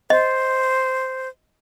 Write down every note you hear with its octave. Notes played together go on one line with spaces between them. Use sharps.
C5 D#5